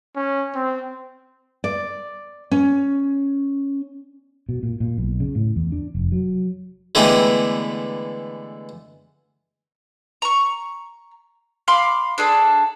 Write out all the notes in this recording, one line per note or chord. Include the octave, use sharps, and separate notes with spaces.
C#4
C4
D5
C#4
B2
A#2
A#2
B1
C#3
A2
E2
D4
F1
F#3
D3 E3 G#3 A3 B3 G4
A#5 C#6
F5 B5 C6 D6
D4 G#4 A4